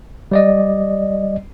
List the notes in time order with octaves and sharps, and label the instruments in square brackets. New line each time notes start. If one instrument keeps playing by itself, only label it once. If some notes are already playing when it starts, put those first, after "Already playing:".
[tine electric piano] G3 D5 D#5